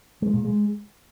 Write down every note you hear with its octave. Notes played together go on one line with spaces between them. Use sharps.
G#3
A#2
G#3